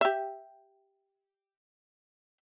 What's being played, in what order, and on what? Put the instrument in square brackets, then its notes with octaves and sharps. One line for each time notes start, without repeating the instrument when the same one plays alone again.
[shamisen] G4 E5